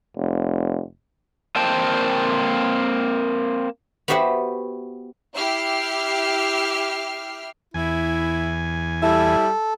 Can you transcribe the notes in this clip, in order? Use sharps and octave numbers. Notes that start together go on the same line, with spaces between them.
F1
A#3 C4 A#4 C5 G5 A5
B3 F#4 G4 C5 E5 F#5
E4 G4 E5 F6 C7
E2 E4 G#5
G3 E4 A4